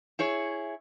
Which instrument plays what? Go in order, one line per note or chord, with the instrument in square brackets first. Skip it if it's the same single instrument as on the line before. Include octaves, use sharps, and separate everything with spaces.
[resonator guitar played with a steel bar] E4 G#4 C#5